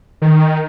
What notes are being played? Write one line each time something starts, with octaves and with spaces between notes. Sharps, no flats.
D#3